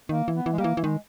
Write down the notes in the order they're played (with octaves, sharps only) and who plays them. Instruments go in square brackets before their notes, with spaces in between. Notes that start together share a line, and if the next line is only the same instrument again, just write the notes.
[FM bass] D#3 [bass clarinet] A#3
[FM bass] E3
[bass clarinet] B3
[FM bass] E3
[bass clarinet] G#3
[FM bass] G3 [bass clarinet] A#3
[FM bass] E3
E3
[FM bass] D#3 [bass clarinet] G#3